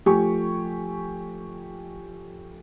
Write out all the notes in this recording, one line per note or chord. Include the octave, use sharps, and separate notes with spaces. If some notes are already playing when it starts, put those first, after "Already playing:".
F3 A3 G4 G#5 C#6